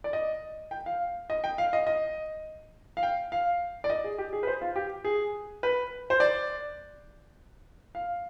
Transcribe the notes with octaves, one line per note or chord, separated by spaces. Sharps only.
D5
D#5
G5
F5
D#5
G5
F5
D#5
D#5
F5
G5
F5
D5
D#5
G#4
G4
G#4
B4
C5
F4
G4
G#4
B4
C5
D5
F5